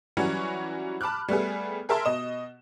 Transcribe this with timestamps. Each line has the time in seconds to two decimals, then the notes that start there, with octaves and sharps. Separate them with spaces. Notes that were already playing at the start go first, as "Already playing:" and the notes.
0.17 E3 F#3 G3 C#4 F#4
1.01 A5 B5 D6 F6 F#6
1.28 G3 A3 B3 G#4
1.89 G#4 A#4 E5 A5 C6
2.05 B2 D#5 E7